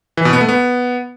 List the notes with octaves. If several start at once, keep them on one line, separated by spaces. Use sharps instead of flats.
E3
B2
B3
A3
B3